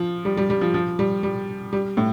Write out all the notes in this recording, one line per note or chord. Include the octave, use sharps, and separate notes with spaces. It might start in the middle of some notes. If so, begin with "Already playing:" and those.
Already playing: F3
G3
G3
G3
F3
F3
G3
G3
G3
A2